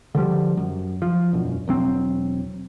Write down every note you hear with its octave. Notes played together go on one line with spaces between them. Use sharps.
D3 F3 G3
F#2
F3
E1 F#2
E1 F#3 C4